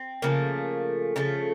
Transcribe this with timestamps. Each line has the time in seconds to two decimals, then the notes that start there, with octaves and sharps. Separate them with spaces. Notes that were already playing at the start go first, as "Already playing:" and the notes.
Already playing: C4
0.22 C#3 F3 A3 A#3
1.16 C#3 F3 A3